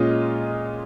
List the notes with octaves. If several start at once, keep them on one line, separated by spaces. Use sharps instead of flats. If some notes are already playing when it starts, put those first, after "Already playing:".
Already playing: A#2 G#3 C#4 F4 D#5